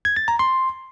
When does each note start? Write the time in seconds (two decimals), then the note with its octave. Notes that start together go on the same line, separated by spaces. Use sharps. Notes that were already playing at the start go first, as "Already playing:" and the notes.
0.05 G#6
0.16 A6
0.28 A#5
0.39 C6